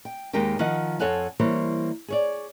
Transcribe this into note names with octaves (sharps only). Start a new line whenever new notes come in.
G5
D#2 G#3 D#4 G4 A#4 G5
D#3 F3 D#5 F#5
F2 C4 A4 C#5 F#5 G#5
E3 G3 A#3 C5 C#5
G#4 C#5 D5